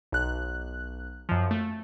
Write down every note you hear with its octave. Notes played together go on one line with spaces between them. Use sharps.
B1 F#6
F#2 F3
A3